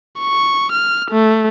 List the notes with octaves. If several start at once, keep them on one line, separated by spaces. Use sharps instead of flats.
C#6
F6
A3